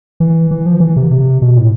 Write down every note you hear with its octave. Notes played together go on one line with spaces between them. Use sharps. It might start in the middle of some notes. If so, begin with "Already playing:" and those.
E3
E3
F3
E3
C3
C3
B2
A2